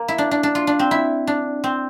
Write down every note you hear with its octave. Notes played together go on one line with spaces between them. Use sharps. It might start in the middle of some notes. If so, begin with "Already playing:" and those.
Already playing: A#3
E4
D4
D4
D4
F4
D4
C4
E4
D4
C4